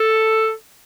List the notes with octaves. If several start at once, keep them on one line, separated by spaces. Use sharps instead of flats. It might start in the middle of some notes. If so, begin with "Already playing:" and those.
Already playing: A4